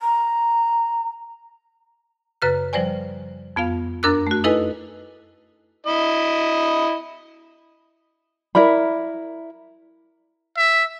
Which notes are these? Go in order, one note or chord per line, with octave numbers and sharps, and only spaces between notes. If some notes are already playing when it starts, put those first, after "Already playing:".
A#5
F#2 C#3 B4 F6 F#6
F3 G3 C5 D5 G#5
F2 B3 F4 F5
F#2 D4 A#4 D6 E6 F#6
A3 F#4
D#4 E4 A4 B4 D#5 G#5
E4 D#5
E4 A#4 D5 B5
E5